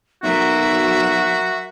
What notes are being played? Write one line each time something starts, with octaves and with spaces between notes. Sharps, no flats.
B1 F#3 A#3 F#4 E5